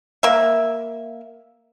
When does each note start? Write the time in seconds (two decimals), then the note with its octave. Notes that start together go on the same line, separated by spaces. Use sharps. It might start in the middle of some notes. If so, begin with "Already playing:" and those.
0.23 A#3 E5